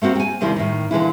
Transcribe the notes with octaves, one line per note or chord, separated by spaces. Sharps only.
A3 A#3 C4 F#4 F#5
G5 G#5
D#2 C3 D#3 G3 A#3 E4
A2 D#3
A#2 D3 E3 E4